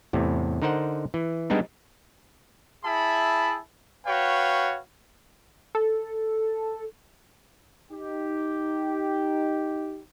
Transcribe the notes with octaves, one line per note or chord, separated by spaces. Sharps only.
E2 A2 C3
D3 D#4 A#4 C5 F#5
E3
G3 G#3 B3 D4 D#4
E4 G#4 E5 A5 B5
F#4 B4 C#5 F5 G5
A4
D#4 G4